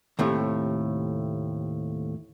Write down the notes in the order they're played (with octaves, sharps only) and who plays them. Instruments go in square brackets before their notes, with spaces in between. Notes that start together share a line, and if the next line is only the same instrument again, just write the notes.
[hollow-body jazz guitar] D#2 A2 C3 A3